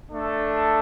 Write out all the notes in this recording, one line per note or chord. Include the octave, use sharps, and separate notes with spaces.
A3 D4 A4